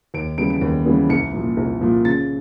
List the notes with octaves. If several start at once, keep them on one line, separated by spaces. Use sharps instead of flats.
D#2 D7
C#3 E3 G3 B3 D7
D7
D#2
C#3 E3 G3 B3
C2 C#7
A#2 F3
C2
A#2 F3
C#3 A6